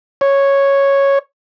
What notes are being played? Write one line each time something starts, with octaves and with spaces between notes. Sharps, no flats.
C#5